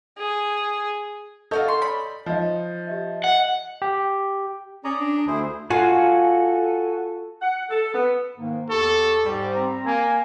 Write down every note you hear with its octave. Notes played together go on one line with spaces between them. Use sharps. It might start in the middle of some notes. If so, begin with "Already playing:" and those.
G#4
F4 F#4 A4 C#5 D#5 G6
C6
C#5 D5 B5
F3 D#4 D#5
G4 D#5 E5
D#5 F#5
G4
C#4 G#4 D5 A#5
D4
D2 E4 G#4 C5
F4 F#4 A4 G#5
F#5
A4
B3
G#2 D#3 A#3
E2 G4 A4 C#6
G#2 G3
C4 A#5
A#3 G#5